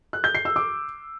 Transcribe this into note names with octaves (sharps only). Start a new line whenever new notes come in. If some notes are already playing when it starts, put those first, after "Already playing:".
F#6
G6
C7
E6
D6